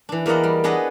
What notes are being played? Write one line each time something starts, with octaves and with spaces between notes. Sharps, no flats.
E3 D4
E2 A#3 D5 D#5 F#5
G3
B3 D4 G#4 B4 D#5 F#5